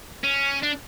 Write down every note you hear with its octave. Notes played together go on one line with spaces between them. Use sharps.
C#4
D4